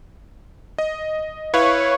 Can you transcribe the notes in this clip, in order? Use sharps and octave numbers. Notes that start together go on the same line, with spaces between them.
D#5
E4 B4 C#5 F5